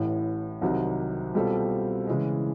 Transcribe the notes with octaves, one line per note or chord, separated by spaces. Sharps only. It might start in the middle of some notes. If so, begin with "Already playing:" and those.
Already playing: A1 A2 E3
C2 C3 D#3 F#3
B2 G3 C4 F4 A4
C#3 E3 G#3